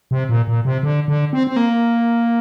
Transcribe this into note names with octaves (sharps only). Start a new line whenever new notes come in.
C3
A#2
A#2
C3
D3
D3
C4
C4
A#3